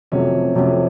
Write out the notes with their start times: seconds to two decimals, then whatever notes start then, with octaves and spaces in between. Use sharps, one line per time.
0.12 F2 C3 F#3 A3 C#4
0.55 F2 C3 F#3 A3 C#4